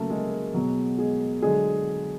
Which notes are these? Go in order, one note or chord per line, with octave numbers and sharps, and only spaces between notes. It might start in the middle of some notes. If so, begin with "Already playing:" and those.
Already playing: C#3 F#3 A3 A#3 A4 A#4
G#3 G#4
B2 F#3
G#3 G#4
D3 F#3 G#3 G#4